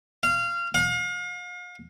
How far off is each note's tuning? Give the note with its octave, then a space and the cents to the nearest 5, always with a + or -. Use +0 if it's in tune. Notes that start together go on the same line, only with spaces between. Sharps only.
F5 -20
F5 +40